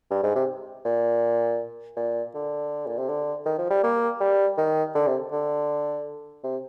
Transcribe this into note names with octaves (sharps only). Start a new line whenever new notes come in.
G2
G#2
C3
A#2
A#2
D3
A#2
C3
D3
D#3
F3
G3
A#3
G3
D#3
D3
C3
D3
C3